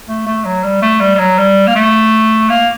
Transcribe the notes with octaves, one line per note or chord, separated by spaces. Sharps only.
A3
A3
F#3
G3
A3
G3
G3
F#3
G3
A#3
A3
A#3